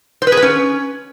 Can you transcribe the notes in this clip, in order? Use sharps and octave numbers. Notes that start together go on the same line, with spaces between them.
C5
B4
G#4
B4
C#4